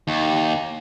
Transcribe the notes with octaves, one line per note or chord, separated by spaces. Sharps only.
D#2